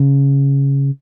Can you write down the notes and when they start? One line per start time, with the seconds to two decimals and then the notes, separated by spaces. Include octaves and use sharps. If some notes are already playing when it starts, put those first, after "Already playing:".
Already playing: C#3